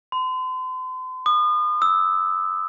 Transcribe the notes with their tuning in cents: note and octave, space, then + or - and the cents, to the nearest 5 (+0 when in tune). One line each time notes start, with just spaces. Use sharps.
C6 -40
D#6 -40
E6 -10